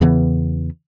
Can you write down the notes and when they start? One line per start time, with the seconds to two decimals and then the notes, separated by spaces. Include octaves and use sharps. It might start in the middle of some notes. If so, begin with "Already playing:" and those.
0.01 E2 C#3 E3 B3